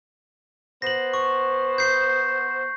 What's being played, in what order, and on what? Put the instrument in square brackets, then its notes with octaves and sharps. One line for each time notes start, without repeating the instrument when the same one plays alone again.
[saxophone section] B3 C5 [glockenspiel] A#6 F#7
[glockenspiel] C#6
G6 C7